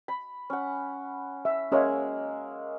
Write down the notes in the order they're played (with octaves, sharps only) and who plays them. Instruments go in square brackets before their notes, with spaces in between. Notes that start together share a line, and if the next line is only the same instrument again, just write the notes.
[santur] B5
C#4 F#5
[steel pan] E5
[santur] G#3 A#3 E5 [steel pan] C#4 C#5 F5